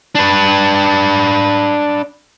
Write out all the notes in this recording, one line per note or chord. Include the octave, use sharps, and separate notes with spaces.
D4 B4